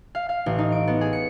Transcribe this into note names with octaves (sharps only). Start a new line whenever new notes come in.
F5
F5
A1
D#4
D7
B3
G#4
C#7